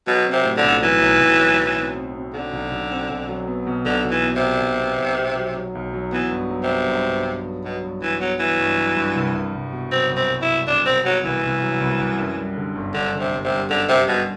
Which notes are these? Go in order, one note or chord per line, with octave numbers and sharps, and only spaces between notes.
B2 F#3
C4
C3
A2
D3
B1
E3 F#3
B1
B1
F#3
F#3
C4
C4
C4
D3 C4
B1
B1
C4
B1
F#3
B3
B2
B1 D3
B2
E3
B3
C3
B1
B1
B3
B1
B2
F#3
F#3
B1
F#3
E3 B3
G2
F#3
C3
B3
G2
G2
G2
F#3
B2 F#3
G2
G2 E3
F#3 B3
E3 F#3
G2
F#3
G2
C2
C2
C2
B2
F#3 C4
C2
C4
C2
E4
C2
C2 D4
C2 C4
B2 F#3
C2 E3
C2
F#3
C2
C2
F#2
G3
D3
G1
G1 D3
D3
C3
G1
C3
G3
F#2 D3
C3 G3
B2 G3